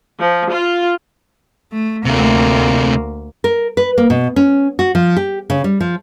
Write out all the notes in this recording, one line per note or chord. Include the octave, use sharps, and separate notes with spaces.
F3
F4
A3
D2 C3 A3 A#3
A#4
B4
A#3
B2
C#4
F#4
F3
G4
C#3
G3
F3